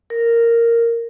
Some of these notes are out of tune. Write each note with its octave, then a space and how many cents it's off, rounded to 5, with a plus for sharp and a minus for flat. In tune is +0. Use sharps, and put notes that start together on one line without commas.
A#4 -5